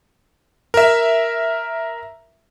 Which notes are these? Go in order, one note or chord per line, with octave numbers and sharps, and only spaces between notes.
A#4 E5